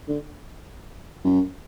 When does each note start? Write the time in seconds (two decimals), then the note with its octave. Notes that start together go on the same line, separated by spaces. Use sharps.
0.08 D3
1.25 F#2